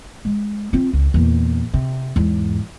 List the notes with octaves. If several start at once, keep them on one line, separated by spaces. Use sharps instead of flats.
G#3
C4 F4
C#2
E2 A#2
C3
E2 G#2